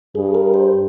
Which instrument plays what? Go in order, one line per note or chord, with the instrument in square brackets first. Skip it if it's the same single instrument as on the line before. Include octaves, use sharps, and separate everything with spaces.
[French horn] G2 [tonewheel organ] G#4
[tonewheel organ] A#4
C5